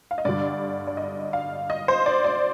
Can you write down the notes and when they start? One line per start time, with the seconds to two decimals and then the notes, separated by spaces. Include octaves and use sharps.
0.11 F5
0.18 D#5
0.25 G2 D3 G3 D5
0.87 D5
0.97 D#5
1.33 F5
1.70 D#5
1.88 C5
2.06 D5
2.24 D5